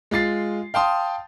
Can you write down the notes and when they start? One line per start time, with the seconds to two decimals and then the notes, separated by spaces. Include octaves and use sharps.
0.11 G#3 F4 A6 C7
0.74 F5 G5 A5 C6 D#6